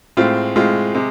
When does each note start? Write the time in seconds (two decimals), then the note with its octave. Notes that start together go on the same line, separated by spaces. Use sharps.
0.17 A2 G#3 C4 F4
0.56 A2 G#3 C4 F4
0.95 C3 G#3